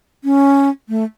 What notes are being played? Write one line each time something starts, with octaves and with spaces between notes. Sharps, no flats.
C#4
A3